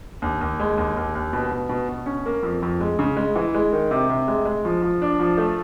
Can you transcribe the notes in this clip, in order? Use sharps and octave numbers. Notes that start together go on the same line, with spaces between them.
D#2
D#2
G#3
D#2
D#2
D#2
B2
B2
B2
B2
C#4
A#3
F2
F2
G#3
C#3
G#3
E3
G#3
D#3
C3
C3
G#3
G#3
F3
F3
D4
F3
A3